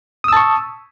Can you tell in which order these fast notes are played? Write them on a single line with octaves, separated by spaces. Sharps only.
D#6 E6 A5 C#6